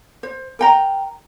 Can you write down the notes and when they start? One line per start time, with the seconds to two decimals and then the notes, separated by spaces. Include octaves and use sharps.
0.23 C5
0.59 A#4 G5 A#5